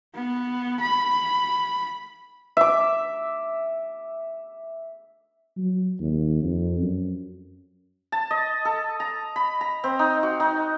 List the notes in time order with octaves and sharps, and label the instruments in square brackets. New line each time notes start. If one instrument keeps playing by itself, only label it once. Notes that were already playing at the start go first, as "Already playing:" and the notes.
[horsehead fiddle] B3
B5
[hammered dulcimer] E5 D6
[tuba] F#3
D#2
F2
F#2
[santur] A5
D#5
A4
A#5
B5
A#5
C4
D#4
F#4
D#4